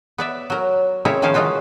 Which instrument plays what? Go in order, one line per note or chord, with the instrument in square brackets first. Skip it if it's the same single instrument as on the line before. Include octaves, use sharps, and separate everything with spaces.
[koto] B3 D5 E5
F#3 A#4
C#3 C4 D#4 E4 A#4 C#5
D#3 F3 C#4 E4 C5 F5
C#3 E3 G#3 D#4 F4 F#4